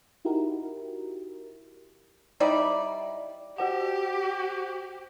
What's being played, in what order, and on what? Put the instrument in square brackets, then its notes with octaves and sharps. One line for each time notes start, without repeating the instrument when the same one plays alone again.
[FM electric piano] D#4 E4 F#4 G4 A#4
[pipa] G3 D#4 E4 D5
[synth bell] F#4 C5 F#5 [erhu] G4